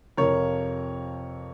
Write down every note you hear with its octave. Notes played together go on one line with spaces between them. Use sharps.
F2 C3 F3 A#4 C#5